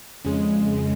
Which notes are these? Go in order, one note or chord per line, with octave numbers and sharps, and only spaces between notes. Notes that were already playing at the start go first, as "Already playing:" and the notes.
F2 C#3 G#3